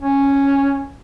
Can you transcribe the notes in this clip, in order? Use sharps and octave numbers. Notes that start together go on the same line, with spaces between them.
C#4